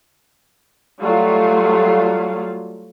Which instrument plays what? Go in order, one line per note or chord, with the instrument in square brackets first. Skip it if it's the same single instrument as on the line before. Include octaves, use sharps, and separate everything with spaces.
[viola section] F#3 G3 A3 F4 F#4 F5